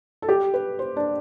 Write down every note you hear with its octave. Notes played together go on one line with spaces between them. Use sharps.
A4
G4
B4
C5
D4